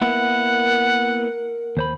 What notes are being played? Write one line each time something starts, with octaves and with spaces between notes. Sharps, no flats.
A#3 B3 E4 A#4 F#5
D#2 C5 B5